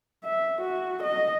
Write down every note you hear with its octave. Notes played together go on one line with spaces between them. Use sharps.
E5
F#4
D#5